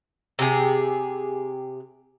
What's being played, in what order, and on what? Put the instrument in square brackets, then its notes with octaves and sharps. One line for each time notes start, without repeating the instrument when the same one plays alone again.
[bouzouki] C3 G4 G#4